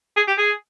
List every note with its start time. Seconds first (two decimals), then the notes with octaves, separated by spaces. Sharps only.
0.17 G#4
0.28 G4
0.38 G#4